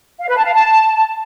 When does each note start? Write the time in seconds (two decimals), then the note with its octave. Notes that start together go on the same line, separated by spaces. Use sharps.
0.20 F5
0.28 B4
0.36 A5
0.44 F5
0.53 A5